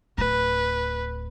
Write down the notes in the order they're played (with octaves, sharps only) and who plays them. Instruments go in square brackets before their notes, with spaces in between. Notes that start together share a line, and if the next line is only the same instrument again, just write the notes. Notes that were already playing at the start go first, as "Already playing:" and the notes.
[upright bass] D1 [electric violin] B4